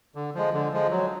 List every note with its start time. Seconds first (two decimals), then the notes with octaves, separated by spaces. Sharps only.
0.15 D3
0.35 F3 G#3
0.53 D3
0.72 F3 G#3
0.91 F#3